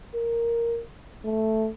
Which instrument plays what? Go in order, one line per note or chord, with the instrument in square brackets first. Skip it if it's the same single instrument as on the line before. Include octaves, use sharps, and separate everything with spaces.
[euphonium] A#4
A3